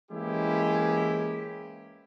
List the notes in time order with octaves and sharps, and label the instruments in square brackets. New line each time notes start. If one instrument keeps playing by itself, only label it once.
[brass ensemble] E3 G#3 A#3 C#4 E4 G4